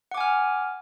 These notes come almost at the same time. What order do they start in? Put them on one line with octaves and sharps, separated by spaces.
F#5 D6 G#5 F6